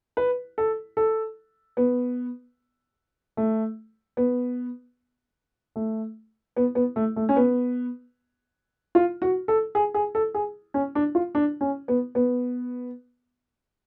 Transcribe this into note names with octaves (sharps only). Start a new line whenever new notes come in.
B4
A4
A4
B3
A3
B3
A3
B3
B3
A3
A3
C#4
B3
F4
F#4
A4
G#4
G#4
A4
G#4
C#4
D4
F4
D4
C#4
B3
B3